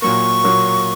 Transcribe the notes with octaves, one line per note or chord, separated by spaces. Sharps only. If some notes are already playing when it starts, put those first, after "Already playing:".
A#2 F#3 A#3 C#6
A#2 F#3 A#3